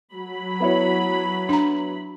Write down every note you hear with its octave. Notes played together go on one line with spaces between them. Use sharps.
F#3 B5
B3 E4 C#5
D4 A#5